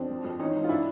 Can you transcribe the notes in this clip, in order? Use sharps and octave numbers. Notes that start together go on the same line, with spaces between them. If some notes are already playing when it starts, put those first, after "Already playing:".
Already playing: F2 C4 D4
F3
F2
A1 C#4 D#4
G#2
F4
D4 E4